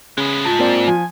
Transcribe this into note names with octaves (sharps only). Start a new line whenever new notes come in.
C#3 G#3 B3
G#2 F4 A5
A#3 C4 D5
F3 G#5